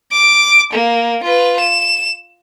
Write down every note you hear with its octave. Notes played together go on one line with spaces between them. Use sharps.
D6
A#3
F4 B4
E7